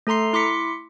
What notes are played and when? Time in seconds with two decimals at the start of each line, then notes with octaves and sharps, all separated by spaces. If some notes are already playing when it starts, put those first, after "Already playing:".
0.07 A3 A4 A#5 C6 C7
0.33 E4 C6 D6 B6 C#7